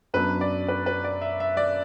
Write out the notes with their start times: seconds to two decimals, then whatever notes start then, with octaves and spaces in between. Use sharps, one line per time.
0.14 F#2 F#3 B3 D4 B4
0.41 D5
0.68 B4
0.86 B4
1.04 D5
1.22 E5
1.40 E5
1.57 D5